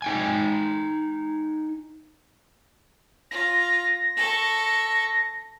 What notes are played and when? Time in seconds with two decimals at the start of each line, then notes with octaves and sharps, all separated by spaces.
0.02 D#4 G5 G#5
3.31 F4 A#6
4.17 A4 C#6